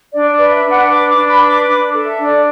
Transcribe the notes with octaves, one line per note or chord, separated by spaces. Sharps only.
D4 D5
D5
B4
E5
D4
F#5
B4 D6
D6
D4
B5
B4
D6
D4 D6
A4
E5
D4
D5